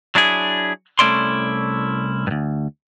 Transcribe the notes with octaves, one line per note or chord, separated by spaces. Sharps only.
F#3 D4 E4 G#4
C2 A3 C#4 E4 D5 C6
D2 G2